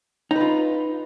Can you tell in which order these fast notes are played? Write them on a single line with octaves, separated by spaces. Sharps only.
D#4 B4 F4